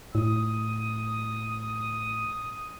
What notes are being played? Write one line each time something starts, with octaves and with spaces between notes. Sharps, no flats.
A2 D#6